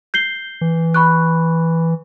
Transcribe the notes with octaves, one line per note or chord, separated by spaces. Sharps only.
G6 C7 G7
E3
B5 C#6 F#6